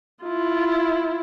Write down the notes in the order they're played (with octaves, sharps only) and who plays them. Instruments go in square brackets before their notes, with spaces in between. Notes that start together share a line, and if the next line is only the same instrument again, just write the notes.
[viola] E4 F4